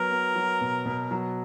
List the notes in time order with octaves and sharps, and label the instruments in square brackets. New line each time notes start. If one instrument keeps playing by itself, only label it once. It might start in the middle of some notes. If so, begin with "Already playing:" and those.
Already playing: [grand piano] F#3 B3 [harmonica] A#4
[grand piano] B3
F#3
B2
B2
F#3